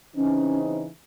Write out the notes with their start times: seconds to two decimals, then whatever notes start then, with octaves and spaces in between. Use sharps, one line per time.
0.15 C#3 E3 C4 C#4 D#4